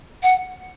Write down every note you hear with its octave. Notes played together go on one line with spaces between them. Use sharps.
F#5